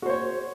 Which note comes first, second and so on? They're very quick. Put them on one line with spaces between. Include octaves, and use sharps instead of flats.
F#4 C5 C#5